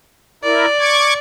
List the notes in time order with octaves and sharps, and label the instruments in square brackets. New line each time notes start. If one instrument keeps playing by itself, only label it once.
[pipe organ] E4 A#4 [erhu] D5
[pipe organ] C#6 D6 G#6